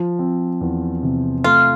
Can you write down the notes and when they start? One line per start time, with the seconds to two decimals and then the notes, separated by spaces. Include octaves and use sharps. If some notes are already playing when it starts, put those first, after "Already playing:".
Already playing: F3
0.19 C4
0.61 E2
1.03 C3
1.44 A3 F4